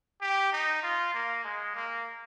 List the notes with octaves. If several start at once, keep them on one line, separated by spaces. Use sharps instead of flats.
G4
D#4
F4
A#3
G#3
A#3